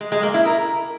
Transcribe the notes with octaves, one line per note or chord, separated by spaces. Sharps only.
G#3
G#3
A#3
E4
A#4